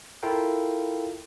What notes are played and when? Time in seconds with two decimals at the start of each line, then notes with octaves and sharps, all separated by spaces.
0.23 E4 F4 A4 A#4 F5 G5